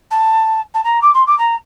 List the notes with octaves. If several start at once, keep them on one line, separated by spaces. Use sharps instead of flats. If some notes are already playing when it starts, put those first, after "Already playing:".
A5
A5
A#5
D6
C6
D6
A#5